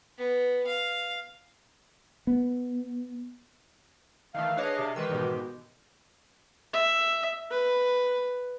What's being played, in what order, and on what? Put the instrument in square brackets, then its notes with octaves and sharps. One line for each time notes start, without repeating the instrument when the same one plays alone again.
[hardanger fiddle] B3
F5
[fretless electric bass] B3
[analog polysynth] D#3 E3 A3 [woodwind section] F5
[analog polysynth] D4 G#4 F5 [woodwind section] B4 C#5 D#5
[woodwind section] C3
[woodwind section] D#3 E3 G#3 [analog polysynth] B4 C5 E6
[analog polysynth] G#2 B2 G4
[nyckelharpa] E5
B4